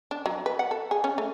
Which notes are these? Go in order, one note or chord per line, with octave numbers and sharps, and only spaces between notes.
D4
F#3
B4
F#5
A4
G#4
C#4
A3